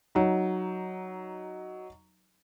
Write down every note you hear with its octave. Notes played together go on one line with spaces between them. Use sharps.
F#3 D#4